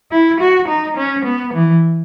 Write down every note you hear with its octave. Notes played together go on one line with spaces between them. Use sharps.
E4
F#4
D#4
C#4
B3
E3